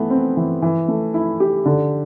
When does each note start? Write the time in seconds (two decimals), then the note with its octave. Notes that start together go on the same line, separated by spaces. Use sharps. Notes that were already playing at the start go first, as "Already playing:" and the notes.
Already playing: E3 A3 B3
0.10 C4
0.37 E3
0.62 E3
0.88 A3
1.14 E4
1.40 G4
1.65 D3